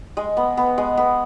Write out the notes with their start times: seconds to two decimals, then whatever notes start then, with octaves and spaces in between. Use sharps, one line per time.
0.17 G#3
0.37 B3
0.57 B3
0.78 G#3
0.97 B3